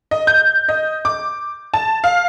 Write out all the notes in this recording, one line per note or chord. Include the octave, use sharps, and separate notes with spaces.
D#5
G6
D#5
D6
A5
F5